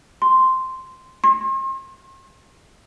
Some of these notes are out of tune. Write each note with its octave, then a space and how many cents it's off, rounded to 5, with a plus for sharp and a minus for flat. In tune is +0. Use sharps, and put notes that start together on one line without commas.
C6 -5
C6 +40